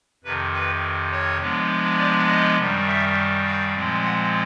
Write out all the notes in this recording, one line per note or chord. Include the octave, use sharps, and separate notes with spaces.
F2 C3 D#3 B4
B4
C#5
C3 F3 G#3 B3 D4
D5
D#5
F#2 D#3 G3
E5
F5
A#2 F3 G#3 C4
F#5